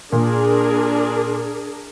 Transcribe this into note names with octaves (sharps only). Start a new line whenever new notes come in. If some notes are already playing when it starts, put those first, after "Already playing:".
A#2 D4 G#4 A#4